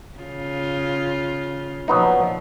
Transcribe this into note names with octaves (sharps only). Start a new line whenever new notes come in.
C#3 F4
A#2 F3 F#3 B3 D#4